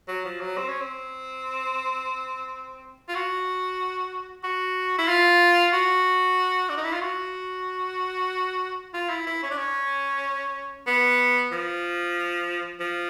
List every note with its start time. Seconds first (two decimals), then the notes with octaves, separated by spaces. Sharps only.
0.08 F#3
0.25 F3
0.41 F#3
0.58 C4
0.69 C#4
0.81 C4
3.09 F4
3.15 F#4
4.44 F#4
4.98 E4
5.08 F4
5.73 F#4
6.69 D4
6.77 D#4
6.84 E4
6.93 F4
7.01 F#4
8.94 F4
9.10 E4
9.27 E4
9.43 C#4
9.50 D4
9.58 C#4
10.87 B3
11.52 F3
12.80 F3